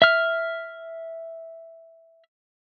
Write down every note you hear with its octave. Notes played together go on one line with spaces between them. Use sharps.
E5 F6